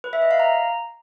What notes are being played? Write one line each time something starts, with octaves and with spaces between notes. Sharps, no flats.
B4
E5
D#5
F5
A#5